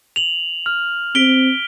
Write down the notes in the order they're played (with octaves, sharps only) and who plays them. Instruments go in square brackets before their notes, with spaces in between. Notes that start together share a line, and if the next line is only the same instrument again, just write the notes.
[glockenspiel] F7 F#7
F6
[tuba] C4 [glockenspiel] B6 D7 G7